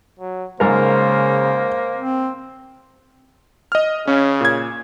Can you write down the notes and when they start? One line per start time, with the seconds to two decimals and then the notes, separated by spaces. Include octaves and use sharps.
0.19 F#3
0.60 G#2 C#3 A#3 A#4 C5
1.97 C4
3.72 D#5 F6
4.07 C#3 C#4
4.41 A#2 G#6